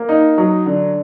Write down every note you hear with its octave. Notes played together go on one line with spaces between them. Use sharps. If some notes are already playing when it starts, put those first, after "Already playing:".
Already playing: A#3
D#4
F#3
D3